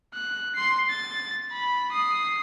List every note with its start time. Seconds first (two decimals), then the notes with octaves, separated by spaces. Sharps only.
0.14 F#6
0.55 C6 C7
0.89 A6
1.52 B5
1.92 D#6 C7